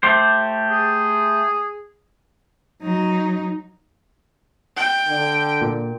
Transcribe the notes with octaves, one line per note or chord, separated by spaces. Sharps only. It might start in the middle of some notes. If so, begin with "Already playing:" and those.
A3 G4 C5
G#4
F#3 D#4
G5
D3
A#2